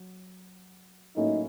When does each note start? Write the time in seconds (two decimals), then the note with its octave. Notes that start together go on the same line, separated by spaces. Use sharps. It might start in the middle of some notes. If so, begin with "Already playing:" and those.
Already playing: F#3
1.16 A2 F#3 A#3 C#4 D#4 E4